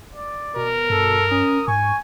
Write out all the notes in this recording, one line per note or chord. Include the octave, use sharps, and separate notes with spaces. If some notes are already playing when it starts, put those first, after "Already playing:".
D5
B2 A#4
G2 A4
C#4 D#6
G#2 G#5 C#6